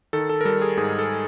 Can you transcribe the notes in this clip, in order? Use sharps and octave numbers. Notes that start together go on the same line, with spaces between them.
D#3 A4
A4
A#4
G3 A4
G#4
G#2 G#4
A4